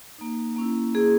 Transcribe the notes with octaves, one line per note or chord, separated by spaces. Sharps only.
A#3 D#4
A#3 C#4 E4
A#3 C#4 E4 G#4